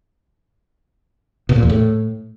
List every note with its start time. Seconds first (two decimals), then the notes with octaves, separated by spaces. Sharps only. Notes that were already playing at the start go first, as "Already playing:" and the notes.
1.49 B2
1.56 A#2
1.63 E2
1.70 A2